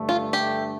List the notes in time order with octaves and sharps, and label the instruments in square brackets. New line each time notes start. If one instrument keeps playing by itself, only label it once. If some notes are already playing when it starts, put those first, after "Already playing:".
Already playing: [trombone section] G2 D3 A3
[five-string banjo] F4
G4